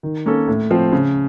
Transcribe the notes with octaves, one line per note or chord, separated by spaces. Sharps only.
D#3
A#3 C#4 A4
A2
F3 C4
C#3